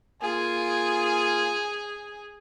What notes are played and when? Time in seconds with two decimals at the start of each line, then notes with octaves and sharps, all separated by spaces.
0.22 A#3 F4 G#4 G#5